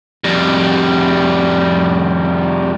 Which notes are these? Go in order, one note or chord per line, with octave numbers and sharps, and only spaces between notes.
F2 G3